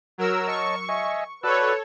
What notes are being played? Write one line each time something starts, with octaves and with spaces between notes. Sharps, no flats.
F#3 A#4 E6
C#5 D#5 A5 C#6
D#5 E5 G#5
F#4 A4 B4 C#5 D5 E6